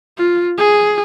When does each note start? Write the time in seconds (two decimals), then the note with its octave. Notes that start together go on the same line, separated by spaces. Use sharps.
0.18 F4
0.58 G#4